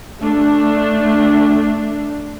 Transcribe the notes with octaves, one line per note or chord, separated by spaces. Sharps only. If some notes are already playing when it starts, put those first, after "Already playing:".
A3 D4